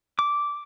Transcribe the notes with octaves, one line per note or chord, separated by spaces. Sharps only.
D6